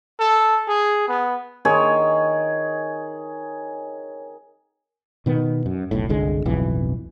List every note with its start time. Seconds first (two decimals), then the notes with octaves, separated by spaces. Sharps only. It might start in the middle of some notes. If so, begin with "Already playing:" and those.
0.19 A4
0.68 G#4
1.08 B3
1.65 D#3 G#4 C#5
5.26 B2 D#3 B3
5.66 F#2
5.91 F1 B1 A2
6.09 G1 C2 D3 G#3
6.45 D1 B1 F2 E3